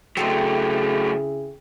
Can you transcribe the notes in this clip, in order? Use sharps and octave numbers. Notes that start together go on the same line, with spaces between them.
C#3 F#3 A3 C4 E4 G#4 A4 D#5